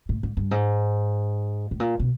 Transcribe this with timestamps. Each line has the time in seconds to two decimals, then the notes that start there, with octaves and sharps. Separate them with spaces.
0.09 A2
0.23 G#2
0.37 G2
0.51 G#2
1.71 A2
1.80 A#2
1.99 B2